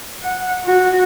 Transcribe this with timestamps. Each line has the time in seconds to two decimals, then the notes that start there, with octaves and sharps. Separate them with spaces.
0.23 F#5
0.66 F#4